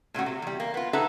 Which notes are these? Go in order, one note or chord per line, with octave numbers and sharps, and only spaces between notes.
A#2 A3 C#4 F#4
C3
E2 G3
A#3
B3 F4
D#4 G#4 A4 B4 E5 F#5